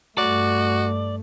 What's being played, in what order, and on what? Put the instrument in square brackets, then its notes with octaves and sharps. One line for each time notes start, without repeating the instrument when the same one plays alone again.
[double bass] G2 A3 [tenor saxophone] F#4 [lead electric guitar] D5